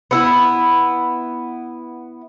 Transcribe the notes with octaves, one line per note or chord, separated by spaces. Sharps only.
B3 E4